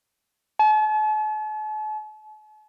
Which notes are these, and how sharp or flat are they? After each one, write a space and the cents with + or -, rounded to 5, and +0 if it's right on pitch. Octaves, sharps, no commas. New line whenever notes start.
A5 -45